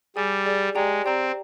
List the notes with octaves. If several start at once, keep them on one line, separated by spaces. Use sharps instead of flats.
G3 G#4 D5 G#5
G#4 D5 G#5
G#3 G4 D5 G5 A#5
C4 G4 D5 G5 A#5